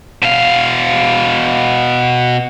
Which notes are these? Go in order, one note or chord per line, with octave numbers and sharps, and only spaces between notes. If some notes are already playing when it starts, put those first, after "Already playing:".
B2 F5